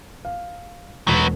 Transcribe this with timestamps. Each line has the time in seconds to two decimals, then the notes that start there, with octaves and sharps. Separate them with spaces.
0.25 F5
1.08 E1 F#3 B3